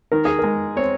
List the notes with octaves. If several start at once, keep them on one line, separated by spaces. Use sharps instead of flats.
D#3 A#4
G#4
G#3 A#4
C4 C#5